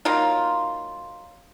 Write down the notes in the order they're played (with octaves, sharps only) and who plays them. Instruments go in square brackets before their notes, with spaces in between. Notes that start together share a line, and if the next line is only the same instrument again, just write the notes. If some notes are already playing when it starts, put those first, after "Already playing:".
[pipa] F#3 A#3 D#4 F4